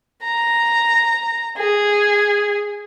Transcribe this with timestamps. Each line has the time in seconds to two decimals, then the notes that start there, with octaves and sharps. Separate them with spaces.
0.24 A#5
1.58 G#4